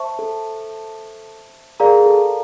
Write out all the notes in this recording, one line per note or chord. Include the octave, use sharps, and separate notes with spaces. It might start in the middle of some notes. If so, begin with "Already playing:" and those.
Already playing: C5 E5 A5 C#6
A4
G#4 A#4 D5 F5 A#5
A4